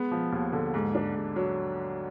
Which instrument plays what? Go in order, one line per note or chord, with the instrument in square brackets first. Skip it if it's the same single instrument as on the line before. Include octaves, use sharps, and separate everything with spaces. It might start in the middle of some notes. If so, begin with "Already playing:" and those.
Already playing: [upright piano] G#3 B3
F3
D#2
D3
G#2
D4
G#2
F#3